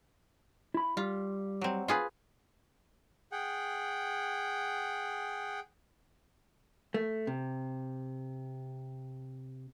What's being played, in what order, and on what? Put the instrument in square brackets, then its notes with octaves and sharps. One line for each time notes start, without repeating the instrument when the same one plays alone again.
[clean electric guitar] E4 B5
[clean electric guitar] G3 [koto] F4
[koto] F#3 C4
F4 G#4 B4
[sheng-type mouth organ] G#4 F#5 G5
[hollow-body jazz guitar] A3
C3